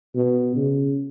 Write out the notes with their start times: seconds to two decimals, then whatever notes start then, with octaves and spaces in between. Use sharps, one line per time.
0.15 B2
0.56 C#3